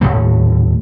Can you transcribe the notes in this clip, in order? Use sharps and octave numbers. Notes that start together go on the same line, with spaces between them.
D#1 G#1 A2 A3